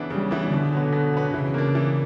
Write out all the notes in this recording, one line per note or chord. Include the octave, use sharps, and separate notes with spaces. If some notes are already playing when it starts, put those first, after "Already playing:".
Already playing: C#3 E3 B3 D4
C#3 G3
E3 B3 D4
B2 D3
F#3 B3
B2
F#3 B3
C#3 E3
A#3 D4
E3